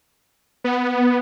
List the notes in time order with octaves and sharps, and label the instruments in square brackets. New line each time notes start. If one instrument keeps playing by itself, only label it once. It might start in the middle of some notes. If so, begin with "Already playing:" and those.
[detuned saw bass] B3